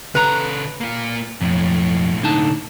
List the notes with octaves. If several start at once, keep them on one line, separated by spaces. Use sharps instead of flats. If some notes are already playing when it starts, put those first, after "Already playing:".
C#3 A4 B4 A#5
A#3 F4
B1 F2 A2
D3 D#4 A5